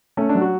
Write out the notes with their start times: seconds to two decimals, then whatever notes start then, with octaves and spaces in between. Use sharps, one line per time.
0.17 A3 C#4
0.29 D4
0.35 F#3
0.41 F#4